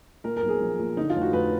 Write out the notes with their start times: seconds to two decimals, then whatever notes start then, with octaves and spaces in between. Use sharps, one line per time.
0.24 A#2 A#4
0.37 A#4
0.42 B1
0.49 G#4
0.60 F3
0.79 A#2
0.97 D3 D#4
1.10 F4
1.16 F1
1.21 F#4
1.33 F1 B4